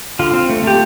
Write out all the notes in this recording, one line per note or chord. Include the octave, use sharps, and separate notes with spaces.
D3 F4
C4
A3
A3 G4